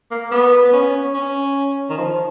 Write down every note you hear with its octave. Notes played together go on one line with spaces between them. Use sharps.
A#3
B3
B3
C#4
C#4
D#3
F3